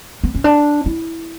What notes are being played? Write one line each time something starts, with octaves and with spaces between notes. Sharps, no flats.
B3
C#4
D4
E4